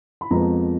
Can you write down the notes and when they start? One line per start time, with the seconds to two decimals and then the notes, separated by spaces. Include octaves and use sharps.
0.21 B5
0.31 F2 F3 G#3 B3 A#5